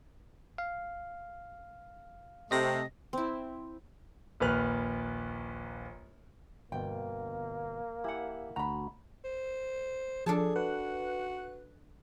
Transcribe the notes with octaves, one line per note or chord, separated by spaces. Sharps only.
F5
C3 A3 D#5 A#6
C4 E4
A#1 D#2 B4 F6 F#6
G1 B2 A#3 G5
E4 G4 E5 F#5 G#5
D2 F#4 F#5 A#5 B5
C5
F3 D4 G#4 A4 A5
F#4 B4 F#6